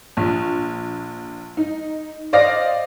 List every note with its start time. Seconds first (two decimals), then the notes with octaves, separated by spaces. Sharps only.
0.17 A#1
1.57 D#4
2.33 C5 D5 D#5 F5 A#6